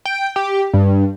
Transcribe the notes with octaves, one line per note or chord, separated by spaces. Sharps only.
G5
G4
G2